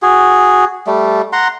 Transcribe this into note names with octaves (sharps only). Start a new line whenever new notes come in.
F#4 G#4
G3 A3
F#5 A#5 C6